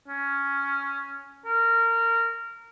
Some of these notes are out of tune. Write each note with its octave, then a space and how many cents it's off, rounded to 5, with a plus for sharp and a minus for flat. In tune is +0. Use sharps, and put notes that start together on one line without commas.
C#4 +5
A#4 -20